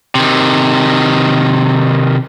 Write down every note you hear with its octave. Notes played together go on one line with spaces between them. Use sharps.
C3 D#3